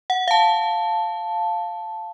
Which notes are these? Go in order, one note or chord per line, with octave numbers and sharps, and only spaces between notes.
F#5
F5 A5